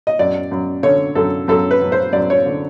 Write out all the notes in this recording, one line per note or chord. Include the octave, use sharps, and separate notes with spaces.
D#5
F#2 D5
F#2
D3 C#5
F#2 A4
F#2 A4
B4
F#2
C5
F#2 D5
C#5
D3